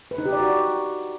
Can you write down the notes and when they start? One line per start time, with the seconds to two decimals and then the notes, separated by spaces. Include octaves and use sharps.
0.11 B4
0.18 D#4
0.25 G4
0.33 D5
0.40 F#4